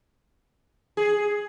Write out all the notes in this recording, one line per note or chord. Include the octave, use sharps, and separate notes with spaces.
G#4